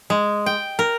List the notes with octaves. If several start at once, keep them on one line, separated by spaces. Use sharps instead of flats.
G#3
G5
A#4